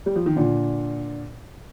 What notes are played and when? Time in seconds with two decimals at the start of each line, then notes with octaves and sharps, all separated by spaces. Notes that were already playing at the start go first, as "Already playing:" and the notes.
0.06 G3
0.16 F3
0.26 D#3
0.36 A#2 D3